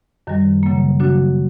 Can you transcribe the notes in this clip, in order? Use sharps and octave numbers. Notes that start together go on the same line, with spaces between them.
F#2 D#3 G3
C#3 F#3 A#3
C#3 F#3 A#3 D4 F#4